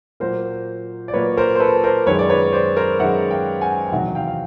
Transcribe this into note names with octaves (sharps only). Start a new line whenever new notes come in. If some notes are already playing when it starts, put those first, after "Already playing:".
A#2 F#3 A#3 A#4 C5
D5
A#2 F#3 A#3 B4 C#5
A#4 C5
C5
A4 B4
A#4 C5
F#2 D#3 G#3 B4 C#5
D5
B4 C#5
C5 D5
A#4 C5
F#2 D#3 G#3 E5 F#5
F5 G5
F#5 G#5
G5
E2 C3 D#3 F#3 E5 F#5
F5 G5
F5